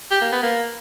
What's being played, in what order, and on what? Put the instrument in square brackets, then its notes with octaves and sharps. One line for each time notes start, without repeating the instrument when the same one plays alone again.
[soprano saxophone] G4
A#3
B3
A#3